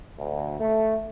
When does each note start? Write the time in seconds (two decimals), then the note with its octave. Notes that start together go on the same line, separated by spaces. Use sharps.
0.19 D2
0.60 A3